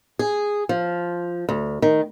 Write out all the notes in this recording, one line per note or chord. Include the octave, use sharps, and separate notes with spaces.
G#4
F3
D2
D#3